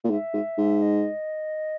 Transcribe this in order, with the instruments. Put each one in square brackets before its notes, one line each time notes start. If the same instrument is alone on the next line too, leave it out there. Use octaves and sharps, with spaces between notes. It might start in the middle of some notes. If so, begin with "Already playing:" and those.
[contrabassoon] A#2
[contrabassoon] G#2 [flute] E5
[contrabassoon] G#2
G#2
[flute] D#5